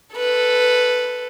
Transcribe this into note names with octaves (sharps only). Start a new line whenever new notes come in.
A4 B4